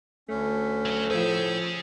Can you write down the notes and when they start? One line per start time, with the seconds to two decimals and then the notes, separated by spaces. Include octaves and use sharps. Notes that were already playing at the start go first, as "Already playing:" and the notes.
0.29 D2 A3 C#4
0.86 F#3 F#4
1.10 A2 F3 C#4 G#4 C5 E6 G6